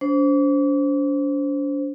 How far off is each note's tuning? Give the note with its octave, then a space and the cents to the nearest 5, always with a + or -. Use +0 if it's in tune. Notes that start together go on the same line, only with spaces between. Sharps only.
D4 -45 C5 +0